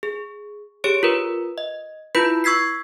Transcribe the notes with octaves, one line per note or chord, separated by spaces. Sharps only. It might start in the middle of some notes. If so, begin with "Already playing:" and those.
G#4
G4 G#4 C#5 D7
F4 A#4 B4
D#5
E4 F4 B4 B5 G6
C#6 E6 G#6 B6 C7